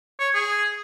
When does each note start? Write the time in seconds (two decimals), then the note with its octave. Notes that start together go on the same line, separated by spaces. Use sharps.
0.19 C#5
0.34 G#4